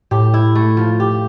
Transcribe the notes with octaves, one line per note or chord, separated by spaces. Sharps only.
A2 G4
E4
A3
F3
G4